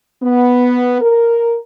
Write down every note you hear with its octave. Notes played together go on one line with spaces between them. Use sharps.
B3
A#4